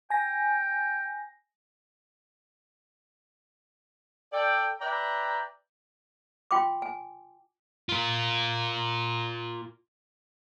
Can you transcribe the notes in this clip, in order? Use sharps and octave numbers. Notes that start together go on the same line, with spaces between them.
G5 G#5 A#6
A4 D5 G5
B4 D5 E5 G5 A#5
F4 G5 C6 D6
G#5
F4 A#4